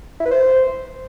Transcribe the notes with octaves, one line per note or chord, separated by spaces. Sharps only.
E4
B4
C5